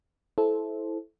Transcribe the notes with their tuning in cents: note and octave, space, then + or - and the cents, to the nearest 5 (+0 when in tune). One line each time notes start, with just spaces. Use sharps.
E4 -5 A4 -20 C5 +0